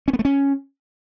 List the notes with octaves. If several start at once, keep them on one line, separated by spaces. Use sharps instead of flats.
C#4
B3
A3
C#4